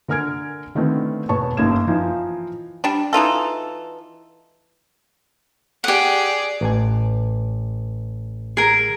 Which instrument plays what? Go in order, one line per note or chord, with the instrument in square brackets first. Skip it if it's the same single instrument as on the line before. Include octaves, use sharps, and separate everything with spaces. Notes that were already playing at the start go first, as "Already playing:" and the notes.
[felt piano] D3 A#4 G#5 F6 G#6 D7
D3 D#3 A3 B3 C4 D4
E1 B3 C#5 A5 C#6
G1 F#2 A#3 D#4 G#6 E7
E3 F3 D#4 F4
[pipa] G3 D4
E3 D#4 F4 A4
[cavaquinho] G4 F#5 [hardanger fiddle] G#4 D5
[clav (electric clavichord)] A1 G#5
[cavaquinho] G#4 A#4